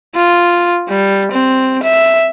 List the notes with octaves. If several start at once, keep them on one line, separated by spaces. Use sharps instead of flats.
F4
G3
C4
E5